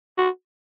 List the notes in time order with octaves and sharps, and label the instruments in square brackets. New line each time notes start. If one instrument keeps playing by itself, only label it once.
[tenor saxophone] F#4